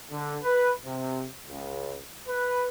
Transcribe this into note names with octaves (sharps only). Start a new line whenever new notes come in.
D3
B4
C3
C#2
B4